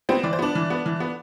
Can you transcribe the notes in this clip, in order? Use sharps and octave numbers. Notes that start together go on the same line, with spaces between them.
B3 C4 C5
E3 D5
C5
B3 D4 D5
E3
B3
E3
B3